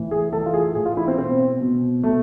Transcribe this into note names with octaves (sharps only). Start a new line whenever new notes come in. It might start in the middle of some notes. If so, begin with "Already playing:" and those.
Already playing: A2 E3
G#4
A2 A4
E3
F4
G#4
A2 E3 G#4
F4
E4
C4
B2 C4
B2
B2 A3